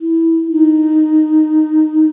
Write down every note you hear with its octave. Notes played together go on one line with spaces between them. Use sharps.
E4
D#4